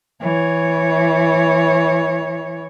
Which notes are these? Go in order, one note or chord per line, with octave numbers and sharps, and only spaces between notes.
E3 C#5